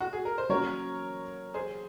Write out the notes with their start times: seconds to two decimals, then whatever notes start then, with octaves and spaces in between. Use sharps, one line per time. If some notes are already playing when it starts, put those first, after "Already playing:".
0.00 F#4
0.13 G#4
0.25 A#4
0.38 C5
0.49 F#3 A#3 C#4 F#4 A#4 C#5
1.54 G#4 C5